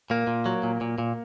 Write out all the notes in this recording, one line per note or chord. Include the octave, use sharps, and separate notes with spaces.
A#2 A#3
A#2
F#3
A#2
A#2
A#2